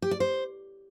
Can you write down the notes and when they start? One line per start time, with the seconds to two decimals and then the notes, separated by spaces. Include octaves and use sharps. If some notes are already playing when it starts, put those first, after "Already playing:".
0.02 G4
0.11 D5
0.20 C5